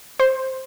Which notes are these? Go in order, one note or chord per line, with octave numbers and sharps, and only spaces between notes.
C5